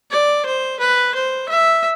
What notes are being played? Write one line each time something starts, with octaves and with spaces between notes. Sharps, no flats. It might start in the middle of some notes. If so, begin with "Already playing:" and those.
D5
C5
B4
C5
E5